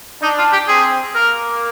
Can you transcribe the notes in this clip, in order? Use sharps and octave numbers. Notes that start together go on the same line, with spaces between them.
D4 D#4
F4
G4
C4 G#4
A#3 A#4